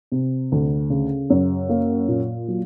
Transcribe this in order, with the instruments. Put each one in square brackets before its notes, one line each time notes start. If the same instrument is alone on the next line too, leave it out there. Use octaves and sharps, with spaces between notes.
[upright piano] C3
D2
C#3
F#2
A#3
A#2
F#3